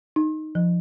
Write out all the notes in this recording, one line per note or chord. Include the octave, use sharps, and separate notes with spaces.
D#4
F3